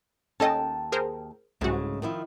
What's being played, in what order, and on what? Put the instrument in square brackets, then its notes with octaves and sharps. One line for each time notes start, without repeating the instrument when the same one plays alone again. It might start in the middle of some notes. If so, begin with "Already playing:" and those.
[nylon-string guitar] D#2 G5 A5 [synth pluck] C#4 A4 D#5
[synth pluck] G#4 A#4 C5
[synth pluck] C2 F#4 [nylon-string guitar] G#2 C#3 A3
[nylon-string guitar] D#3 F3 E4